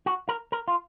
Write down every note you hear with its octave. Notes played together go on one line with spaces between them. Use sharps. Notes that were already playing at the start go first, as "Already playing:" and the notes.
F#4
A#4
A#4
F4